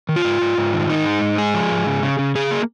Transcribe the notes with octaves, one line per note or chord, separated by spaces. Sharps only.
D#3
F4
G#2
G#2
G#2
D#3
G#2 D#4
G#3
G#2
G#3 G#4
F3
G#2
C#3
C#3
C#3
C#3 G#4
A#3